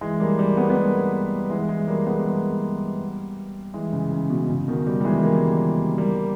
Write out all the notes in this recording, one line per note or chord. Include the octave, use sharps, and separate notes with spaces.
E3 G#3
G3 A#3
G3 A#3
G#3 B3
B3
G3 A#3
E3 G#3
E3 G#3
G3 A#3
G#3 B3
G3 A#3
E3 G#3
C#3
C#3
B2
C#3
B2 D#3
D#3 G3
G3
E3 G#3
G3 A#3
G3 A#3